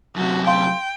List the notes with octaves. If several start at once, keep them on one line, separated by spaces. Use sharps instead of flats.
F#2 C3 F#4
F5 G5 C6